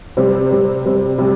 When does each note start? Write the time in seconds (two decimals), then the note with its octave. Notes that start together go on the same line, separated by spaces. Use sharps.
0.17 C3 G3 C4
0.51 C3 G3 C4
0.85 C3 G3 C4
1.18 C3 G3